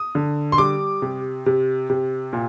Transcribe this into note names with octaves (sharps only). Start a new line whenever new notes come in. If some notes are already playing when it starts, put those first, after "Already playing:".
Already playing: D#6
D3
C6
G3 D6
C3
C3
C3
A#2